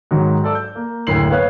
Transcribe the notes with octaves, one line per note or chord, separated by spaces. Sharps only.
G#2 D#3 F#3
A4 D5 E6
G6
A#3
F#1 D2 A2 C7 F#7
B3 C#5 F5 F#6